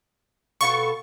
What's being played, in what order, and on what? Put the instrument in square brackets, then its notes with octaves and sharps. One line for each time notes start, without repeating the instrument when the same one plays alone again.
[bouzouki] B2 F4 A4 [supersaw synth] C#6